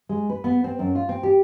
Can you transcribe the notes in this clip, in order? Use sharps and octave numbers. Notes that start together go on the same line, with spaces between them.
G#3
B4
B3
C4
F#2
F4
C4
G4